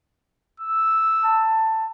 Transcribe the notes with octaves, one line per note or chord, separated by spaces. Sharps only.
E6
A5